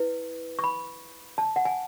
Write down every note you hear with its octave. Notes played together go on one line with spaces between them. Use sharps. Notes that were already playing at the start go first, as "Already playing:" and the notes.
Already playing: E4 B4
C#6
B5
A5
F#5
G#5